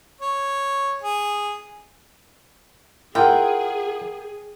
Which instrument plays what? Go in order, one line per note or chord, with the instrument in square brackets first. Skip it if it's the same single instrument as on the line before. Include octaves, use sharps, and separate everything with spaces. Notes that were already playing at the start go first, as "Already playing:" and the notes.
[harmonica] C#5
G#4
[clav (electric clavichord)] E4 F4 [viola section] G#4 [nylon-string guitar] A#4 F#5 [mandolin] G5